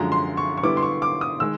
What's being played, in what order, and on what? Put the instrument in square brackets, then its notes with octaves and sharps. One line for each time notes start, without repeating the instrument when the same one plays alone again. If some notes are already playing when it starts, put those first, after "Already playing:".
Already playing: [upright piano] F#2 D3 F3 G#3 A#5
C6
C#6
C#6
D3 G3 B3 E4 D6
C6
C#6
D6
D#6
D#3 G#3 E6